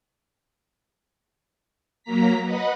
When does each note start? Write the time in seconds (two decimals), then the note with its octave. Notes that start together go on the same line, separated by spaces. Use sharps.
2.03 F#3 A#3 A#5 B6
2.44 B4 D#5 F#5 B5